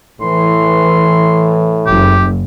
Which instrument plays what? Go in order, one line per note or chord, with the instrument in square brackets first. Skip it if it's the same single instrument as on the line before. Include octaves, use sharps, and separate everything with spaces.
[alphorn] A2 [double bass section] E3 [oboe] C6
[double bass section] F#1 [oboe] G4